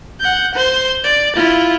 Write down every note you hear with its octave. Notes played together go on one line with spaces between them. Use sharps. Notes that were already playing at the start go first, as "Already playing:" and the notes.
F#5 G6
C5 C6
D5
E4 F4